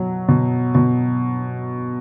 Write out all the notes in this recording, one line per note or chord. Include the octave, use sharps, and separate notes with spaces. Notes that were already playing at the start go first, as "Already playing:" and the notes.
Already playing: B2 F#3
B2
B2